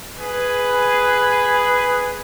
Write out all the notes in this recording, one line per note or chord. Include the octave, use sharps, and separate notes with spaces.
G#4 B4